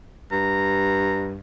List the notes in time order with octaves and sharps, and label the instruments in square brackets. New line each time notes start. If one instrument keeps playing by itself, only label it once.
[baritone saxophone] G2 [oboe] A#5